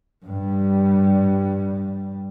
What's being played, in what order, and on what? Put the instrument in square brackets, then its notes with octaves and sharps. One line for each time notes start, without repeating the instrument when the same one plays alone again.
[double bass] G2 G3